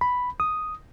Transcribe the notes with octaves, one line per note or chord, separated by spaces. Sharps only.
B5
D#6